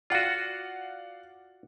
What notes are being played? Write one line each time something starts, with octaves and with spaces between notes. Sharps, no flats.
F4 F#4 D5 F5 F#5